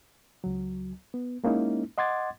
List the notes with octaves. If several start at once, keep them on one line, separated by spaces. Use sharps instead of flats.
C#2 F#3
B3
G#3 A#3 C#4 D#4 E4
D#5 F#5 C6 D6 G#6 A6